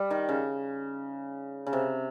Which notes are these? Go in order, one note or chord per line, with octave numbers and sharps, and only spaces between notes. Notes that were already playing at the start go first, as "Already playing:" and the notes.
Already playing: G3
D#3
C#3
C#3
C3